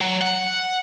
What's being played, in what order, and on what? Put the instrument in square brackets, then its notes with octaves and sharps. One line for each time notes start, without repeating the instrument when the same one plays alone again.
[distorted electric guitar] F#3
F#5